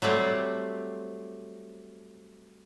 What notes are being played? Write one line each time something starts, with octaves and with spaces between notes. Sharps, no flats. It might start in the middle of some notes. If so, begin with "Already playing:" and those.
F#3 G3 A3 C4